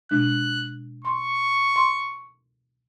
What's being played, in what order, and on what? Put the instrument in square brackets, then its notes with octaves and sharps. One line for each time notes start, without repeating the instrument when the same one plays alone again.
[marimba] B2 G#3 D4 [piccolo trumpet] F#6
[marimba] C6 [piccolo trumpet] C#6
[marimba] C6